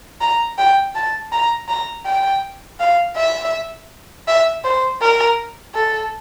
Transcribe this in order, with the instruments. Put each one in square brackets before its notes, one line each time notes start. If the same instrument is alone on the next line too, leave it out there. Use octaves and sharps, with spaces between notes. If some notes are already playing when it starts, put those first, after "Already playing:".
[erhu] A#5
G5
A5
A#5
A#5
G5
F5
E5
E5
C5
A#4
A4